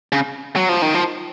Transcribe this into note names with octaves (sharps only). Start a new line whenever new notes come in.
C#3
F#3
F3
D#3
F3